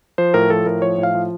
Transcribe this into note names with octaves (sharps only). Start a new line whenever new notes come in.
F3 C5
A2 A#4
F3 A4
A2 A#4
F3 C#5
A2
F5
F3